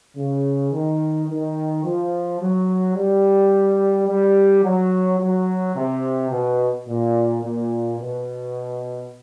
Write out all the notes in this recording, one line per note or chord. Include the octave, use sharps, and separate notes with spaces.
C#3
D#3
D#3
F3
F#3
G3
G3
F#3
F#3
C3
B2
A#2
A#2
B2